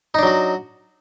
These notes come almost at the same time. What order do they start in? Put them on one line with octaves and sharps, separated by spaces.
D#4 D4 F#3 F#4